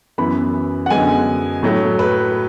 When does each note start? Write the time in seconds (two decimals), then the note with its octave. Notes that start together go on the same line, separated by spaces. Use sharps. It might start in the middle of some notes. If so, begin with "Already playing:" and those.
0.18 F#2 E3 B3 B5
0.86 F#5
0.90 F#2 D3 G#3 B3 G#5
1.63 A2 F#3 A3
1.99 B4